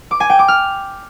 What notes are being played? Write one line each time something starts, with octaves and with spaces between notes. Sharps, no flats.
D6
G#5
G5
D6
F6